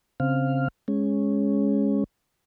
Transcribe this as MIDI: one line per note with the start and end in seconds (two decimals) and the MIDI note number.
0.20 0.68 49
0.20 0.68 60
0.20 0.68 77
0.88 2.04 56
0.88 2.04 61